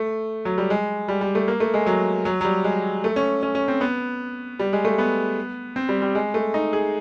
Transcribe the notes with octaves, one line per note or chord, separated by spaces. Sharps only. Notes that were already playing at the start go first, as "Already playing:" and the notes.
Already playing: A3
F#3
G3
G#3
G3
G3
A3
A#3
A3
G#3
F#3
F#3
F#3
G3
G#3
A3
C#4
C#4
C#4
C4
B3
G3
G#3
A3
B3
C4
G3
G3
G#3
A3
D#4
G#4